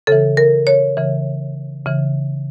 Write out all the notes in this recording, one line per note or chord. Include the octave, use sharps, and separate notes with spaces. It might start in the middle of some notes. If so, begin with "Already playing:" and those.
C#3 E3 A4
A#4
C#5
C#3 E3
C#3 E3